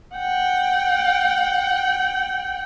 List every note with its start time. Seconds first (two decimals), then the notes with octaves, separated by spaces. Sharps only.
0.16 F#5 G5